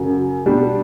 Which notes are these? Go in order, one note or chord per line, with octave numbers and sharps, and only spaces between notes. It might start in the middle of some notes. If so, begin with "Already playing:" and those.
Already playing: F#2 C#3 F#3
B2 G3 D4